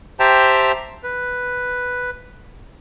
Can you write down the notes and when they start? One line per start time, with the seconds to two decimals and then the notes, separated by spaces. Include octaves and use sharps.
0.20 G4 C5 E5 G5 A5 A#5
1.04 B4